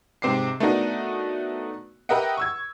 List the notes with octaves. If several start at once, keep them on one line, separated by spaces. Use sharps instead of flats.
G#2 C3 C4 D6 C7
A3 B3 D4 D#4 F#4 A#4
G4 A#4 B4 D#5 E5 F#5
C#6 E6 G#6